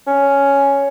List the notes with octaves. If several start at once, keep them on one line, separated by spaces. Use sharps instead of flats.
C#4